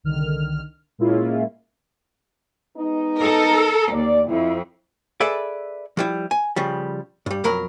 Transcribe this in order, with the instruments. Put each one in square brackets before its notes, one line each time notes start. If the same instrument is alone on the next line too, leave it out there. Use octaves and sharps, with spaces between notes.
[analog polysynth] C2 D3 D#3 F6
A#2 G#3 A#3 C#4 E4 F4
[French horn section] G#3 B3 D#4
[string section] A4 A#4
[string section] D#2 [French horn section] D5
[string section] F2 [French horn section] E4
[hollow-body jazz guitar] G#4 A4 B4 D5 E5
F3 G3 E4
G#5
C#3 F3 G3
G2 G3
B1 F2 F#3 A#4 B5